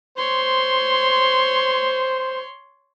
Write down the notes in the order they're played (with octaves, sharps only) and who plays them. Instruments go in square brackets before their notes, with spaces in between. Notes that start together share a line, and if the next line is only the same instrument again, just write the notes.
[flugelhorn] C5 [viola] C#5 C6